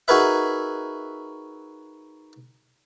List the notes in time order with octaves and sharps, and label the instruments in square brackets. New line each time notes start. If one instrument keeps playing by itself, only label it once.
[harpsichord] D#4 F#4 G#4 A#4 B4 E5